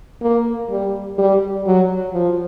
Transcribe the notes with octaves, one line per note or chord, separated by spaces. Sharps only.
A#3
G3
G3
F#3
F3